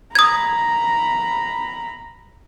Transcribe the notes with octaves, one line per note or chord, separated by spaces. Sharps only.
A#5 B5 D#6 G#6